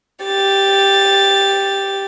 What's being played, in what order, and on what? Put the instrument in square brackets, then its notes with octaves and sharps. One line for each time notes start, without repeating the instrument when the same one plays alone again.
[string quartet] G4 A6